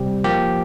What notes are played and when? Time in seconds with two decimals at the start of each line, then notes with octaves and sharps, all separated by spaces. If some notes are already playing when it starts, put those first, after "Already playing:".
Already playing: C3 G3 C4 G4
0.24 F3 A#3 G4